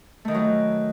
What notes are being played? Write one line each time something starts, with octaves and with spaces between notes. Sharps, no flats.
D#3 E3 F#3 A3